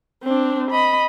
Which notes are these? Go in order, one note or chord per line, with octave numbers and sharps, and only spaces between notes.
C4 D4
D#5 B5